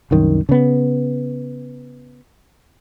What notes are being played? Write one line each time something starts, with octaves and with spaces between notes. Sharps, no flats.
C2 F#2 D#3
C#3 B3